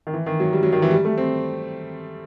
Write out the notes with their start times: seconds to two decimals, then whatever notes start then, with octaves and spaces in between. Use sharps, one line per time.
0.07 D#3
0.13 E3
0.26 D#3
0.40 F#3
0.53 G3
0.63 F#3
0.73 D#3
0.82 E3
0.91 G3
1.05 A3
1.18 C4